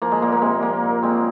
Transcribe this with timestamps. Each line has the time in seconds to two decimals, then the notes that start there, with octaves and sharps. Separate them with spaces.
0.02 F3 A#3
0.12 G#3
0.22 A#2 A#3
0.32 A#3
0.42 C3 G#3
0.62 F3 A#3
0.83 A#2
1.02 F#3 G#3 C4